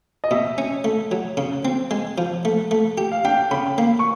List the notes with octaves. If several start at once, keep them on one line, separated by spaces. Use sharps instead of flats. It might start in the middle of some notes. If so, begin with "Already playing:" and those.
D#5
B2 E5
C#4
A3
F#3
C#3
C4
G#3
F3
A3
A3
G4
F5
D4 G5
C#3 B5
A#3
C#6